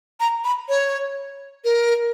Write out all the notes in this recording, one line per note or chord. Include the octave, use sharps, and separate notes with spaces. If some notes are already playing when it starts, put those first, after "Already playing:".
A#5
B5
C#5
A#4